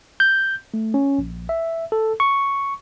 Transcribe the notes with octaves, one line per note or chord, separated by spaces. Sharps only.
G6
A3
C#4
A#1
E5
A4
C#6